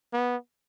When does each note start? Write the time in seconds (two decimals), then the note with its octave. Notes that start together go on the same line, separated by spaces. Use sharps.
0.13 B3